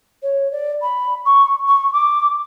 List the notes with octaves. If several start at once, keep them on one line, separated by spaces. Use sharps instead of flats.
C#5
D5
B5
C#6
C#6
D6